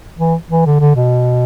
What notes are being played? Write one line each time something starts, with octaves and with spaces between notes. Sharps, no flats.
E3
E3
D3
D3
B2